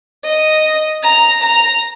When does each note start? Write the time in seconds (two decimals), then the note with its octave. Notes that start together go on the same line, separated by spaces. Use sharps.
0.25 D#5
1.03 A#5
1.42 A#5